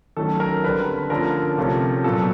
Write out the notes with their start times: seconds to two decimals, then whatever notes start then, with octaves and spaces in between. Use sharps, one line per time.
0.16 D#3 F#3 A3 C#4 A4
0.40 A#4
0.64 D3 G3 C4 B4
1.10 D3 F3 A3 C#4 A#4
1.58 C3 F3 A3 C#4
2.04 A#2 F#3 B3 A4